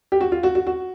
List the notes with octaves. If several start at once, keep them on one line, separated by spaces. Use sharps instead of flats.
G4
F#4
F4
F#4
F#4
F#4